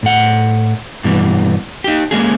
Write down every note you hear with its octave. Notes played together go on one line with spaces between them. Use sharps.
A2 F#5
G2 B2 E3 G3
D#4 G4
G#3 A#3 C#4 G#4